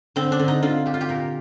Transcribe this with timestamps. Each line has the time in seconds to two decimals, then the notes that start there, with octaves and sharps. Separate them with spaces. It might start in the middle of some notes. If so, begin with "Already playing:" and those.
0.16 D3 C4
0.32 D4
0.40 D3
0.48 D#4
0.63 D3 F4
0.86 D3 G4
0.94 F4
1.01 G4
1.09 A#2 A#4